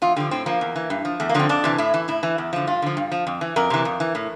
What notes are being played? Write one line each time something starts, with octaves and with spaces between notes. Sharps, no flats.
E2 F4
D3 F3 G4
A2 C4
F3 A#3
E2
E3
G2
F3
E2 A3
A#3
D3 F3 C4
F2 D4
C3 E3
A2 E4
E3
A2 E4
E3
E2
D3 F3
G2 F4
D3 F3
G2
F3
F2
E3
F2 A#4
C3 E3
F2
E3
A2